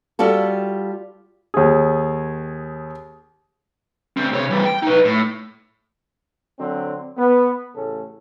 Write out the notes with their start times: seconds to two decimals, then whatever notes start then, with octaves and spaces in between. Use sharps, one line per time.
0.19 G3 F4 F#4 A4
1.54 D#2 G#4
4.17 D2 C4
4.33 C3 C#5
4.51 E3 G3
4.65 G5
4.83 D#4 B4
5.05 A2
6.60 D3 F#3 C4
7.17 B3
7.75 A1 A2 C#3 C#4 A4